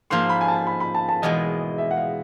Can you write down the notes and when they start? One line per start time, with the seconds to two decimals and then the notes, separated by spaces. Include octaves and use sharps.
0.10 G#2 F3 A#3 C6
0.29 B5
0.41 G#5
0.48 A5
0.67 B5
0.80 B5
0.95 A5
1.09 A5
1.22 E2 B2 G#3 D#5
1.78 E5
1.91 F#5
1.97 F5